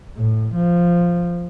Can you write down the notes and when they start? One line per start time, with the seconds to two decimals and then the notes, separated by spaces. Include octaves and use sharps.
0.17 A2
0.55 F3